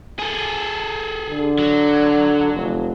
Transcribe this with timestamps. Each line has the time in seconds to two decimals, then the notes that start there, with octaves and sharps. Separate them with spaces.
0.19 G#4 A4
1.30 D3
1.59 F#3
2.53 F1